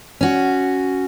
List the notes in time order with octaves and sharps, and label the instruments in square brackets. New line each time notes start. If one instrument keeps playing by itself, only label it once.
[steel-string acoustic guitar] C#4 F#4